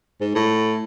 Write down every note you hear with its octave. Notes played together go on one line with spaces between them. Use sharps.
G#2
A2